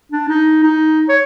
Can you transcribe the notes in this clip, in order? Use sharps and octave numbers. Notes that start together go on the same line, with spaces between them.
D4
D#4
D#4
C#5